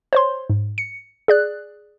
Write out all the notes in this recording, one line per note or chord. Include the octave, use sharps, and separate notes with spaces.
C5 C#5 C6
G#2
C#7
G#4 D5 F#6